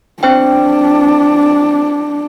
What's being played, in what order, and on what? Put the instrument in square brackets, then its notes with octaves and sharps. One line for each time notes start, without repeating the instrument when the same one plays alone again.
[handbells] C4 C5 G5 [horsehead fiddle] D4